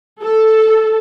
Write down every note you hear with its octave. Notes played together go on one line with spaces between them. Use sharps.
A4